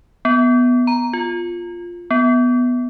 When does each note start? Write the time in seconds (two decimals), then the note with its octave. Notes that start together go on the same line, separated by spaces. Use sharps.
0.25 B3
0.87 A#5
1.13 F4
2.11 B3